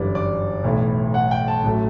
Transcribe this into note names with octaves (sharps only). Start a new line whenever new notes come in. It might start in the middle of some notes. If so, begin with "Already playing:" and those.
Already playing: G1 F#2 E3 G3 D5
D5
B1 A2 E3
F#5
G5
A5
A1 A2 F#3 A3